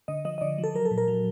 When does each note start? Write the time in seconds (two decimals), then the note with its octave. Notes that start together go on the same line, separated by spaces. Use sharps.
0.08 D3 D#5
0.25 F3 D#5
0.38 D#5
0.41 D3 D5
0.58 F3
0.64 A4
0.74 F#3 A#4
0.85 A4
0.91 A#2
0.98 A#4
1.08 F#3